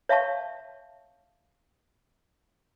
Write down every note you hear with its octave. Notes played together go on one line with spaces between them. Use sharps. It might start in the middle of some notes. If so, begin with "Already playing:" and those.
C#5 E5 F5 A5 C#6